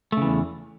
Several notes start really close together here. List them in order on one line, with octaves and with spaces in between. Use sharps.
A3 C#3 E3 E2